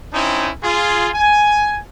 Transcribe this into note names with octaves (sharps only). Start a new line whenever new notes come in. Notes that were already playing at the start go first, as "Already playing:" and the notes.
C4 C#4 D#4 E4
F4 G#4
G#5